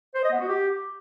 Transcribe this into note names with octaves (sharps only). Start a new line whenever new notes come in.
C5
D#5
B3
F#4
G4